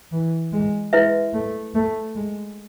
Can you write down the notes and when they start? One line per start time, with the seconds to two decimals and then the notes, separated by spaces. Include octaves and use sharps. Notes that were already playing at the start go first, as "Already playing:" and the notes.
0.12 E3
0.53 G#3
0.93 G#3 E4 B4 E5
1.33 A3
1.75 A3
2.15 G#3